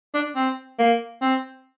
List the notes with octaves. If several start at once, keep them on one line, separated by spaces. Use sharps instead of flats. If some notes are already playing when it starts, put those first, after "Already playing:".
D4
C4
A#3
C4